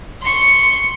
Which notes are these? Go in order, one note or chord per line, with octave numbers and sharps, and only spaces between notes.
C6 C#6